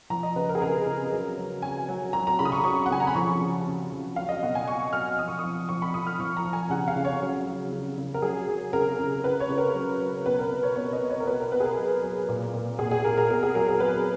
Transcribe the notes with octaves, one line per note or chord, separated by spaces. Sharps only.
F3 A#5
D#5
C#3 B4
A#4
G#4
C#3 A#4
C#3
F#3
F#3
F#3 G#5
F#3
F#3 A#5
A#5
C#3 B5
D#6
C#6
F#3 C#6
F#5
C#3 G#5
A#5
B5
F3 C#6
C#3
C#3
F3
F#3 F5
D#5
B2 F#5
G#5
B2 C#6
F#3 F6
F3 D#6
C#6
F3 D#6
F3 C#6
B5
F3 D#6
F6
F3 C#6
A#5
F3
G#5
C#3 F#5
F5
C#3
C#5
F#3
F#3
C#3
C#3
A#4
F#3 G#4
F#3
C#3 A#4
C#3
C#3 B4
C#5
C#3
A#4
F#3
F#3
B2 B4
A#4
B2
C#5
B2 C#5
D#5
B2
C#5
A#4
B2 B4
A#4
B2 B4
G#4
A#4
F#3
F#3
A#2
A#2
A#2 G#4
G#4
A#2 A#4
A#4
B2 A#4
G#4
F#3 A#4
A#4
F#3 B4